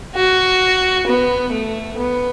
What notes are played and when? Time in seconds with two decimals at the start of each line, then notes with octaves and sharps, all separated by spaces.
0.16 F#4
1.07 B3
1.53 A3
1.98 B3